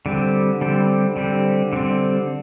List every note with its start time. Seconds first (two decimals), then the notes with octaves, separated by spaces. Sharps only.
0.06 D3 G3 C4
0.61 D3 G3 C4
1.17 D3 G3 C4
1.73 D3 G3 C4